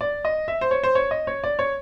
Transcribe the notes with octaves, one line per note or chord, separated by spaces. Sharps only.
D5
D#5
E5
C5
C#5
C5
C#5
D#5
C#5
D5
C#5